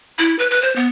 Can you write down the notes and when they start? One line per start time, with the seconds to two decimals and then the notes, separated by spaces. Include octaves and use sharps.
0.18 E4
0.39 B4
0.50 B4
0.62 C5
0.76 B3